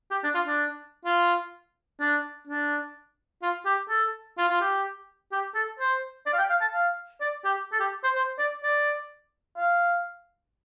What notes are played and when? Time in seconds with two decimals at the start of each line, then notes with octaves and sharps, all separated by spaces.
0.11 G4
0.23 D4
0.34 F4
0.46 D4
1.05 F4
2.00 D4
2.47 D4
3.42 F4
3.65 G4
3.89 A4
4.37 F4
4.48 F4
4.61 G4
5.32 G4
5.54 A4
5.79 C5
6.26 D5
6.33 F5
6.38 G5
6.50 F5
6.61 A5
6.73 F5
7.21 D5
7.45 G4
7.72 A4
7.80 G4
8.03 C5
8.15 C5
8.38 D5
8.63 D5
9.57 F5